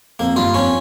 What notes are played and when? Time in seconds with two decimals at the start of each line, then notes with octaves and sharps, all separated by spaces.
0.19 F2 A#3
0.36 G2 F4
0.54 F2 C#4